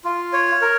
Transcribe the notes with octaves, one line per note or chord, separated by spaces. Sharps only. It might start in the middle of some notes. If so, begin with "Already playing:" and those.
F4
C#5
A#4